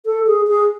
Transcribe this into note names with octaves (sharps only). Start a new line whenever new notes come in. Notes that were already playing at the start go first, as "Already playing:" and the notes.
A4
G#4
G#4